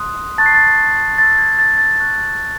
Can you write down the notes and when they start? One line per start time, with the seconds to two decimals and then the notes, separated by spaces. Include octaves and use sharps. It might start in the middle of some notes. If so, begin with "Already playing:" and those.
Already playing: C6 D#6 F#6
0.38 A5 C#6 F#6 A6
0.46 C7
0.55 A6
1.18 C6 E6 A6
1.39 G#6
1.59 A6
1.78 A6
1.98 A5 C#6 F#6